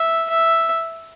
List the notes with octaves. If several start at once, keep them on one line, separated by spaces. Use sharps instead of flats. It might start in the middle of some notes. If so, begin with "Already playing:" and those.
Already playing: E5
E5